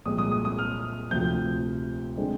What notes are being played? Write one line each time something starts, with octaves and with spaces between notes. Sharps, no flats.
C2 A#2 F3 G#3 C4 D#6
D#6
D#6
D#6
F6
D2 C3 F3 C4 G6
D3 G#3 C4